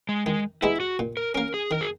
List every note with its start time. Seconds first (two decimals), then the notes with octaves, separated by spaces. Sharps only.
0.09 G#3
0.26 D#3 G#3
0.62 G#3 B3 D#4 E4 G#4
0.80 F#4
0.99 A#2
1.17 A#4
1.35 A#3 C#4 A#4
1.54 G#4
1.71 D#3 A#4
1.81 G#4